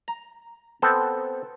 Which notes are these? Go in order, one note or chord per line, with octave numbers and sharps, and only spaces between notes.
A#5
B3 C4 A4